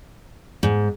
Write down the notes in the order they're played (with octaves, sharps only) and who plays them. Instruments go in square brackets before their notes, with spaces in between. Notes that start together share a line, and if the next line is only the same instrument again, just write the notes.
[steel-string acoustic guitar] G#2